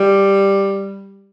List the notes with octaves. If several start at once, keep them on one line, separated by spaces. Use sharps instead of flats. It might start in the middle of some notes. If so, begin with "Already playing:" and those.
Already playing: G3